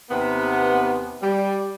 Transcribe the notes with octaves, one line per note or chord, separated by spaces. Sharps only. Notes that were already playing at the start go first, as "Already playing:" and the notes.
D#2 C3 B3
G3